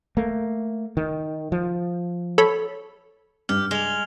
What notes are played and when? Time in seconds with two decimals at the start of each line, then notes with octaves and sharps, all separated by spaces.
0.17 A3 A#3
0.97 D#3
1.52 F3
2.38 A4 C#5 B5
3.49 G2 G4 F6
3.71 G#3 F7 G7